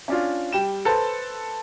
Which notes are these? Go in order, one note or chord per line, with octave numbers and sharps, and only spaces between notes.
C#4 D4 F4
G3 G5 E7
A4 B4 C5 A5